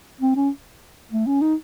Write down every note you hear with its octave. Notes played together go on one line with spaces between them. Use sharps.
C4
C#4
A3
C#4
D#4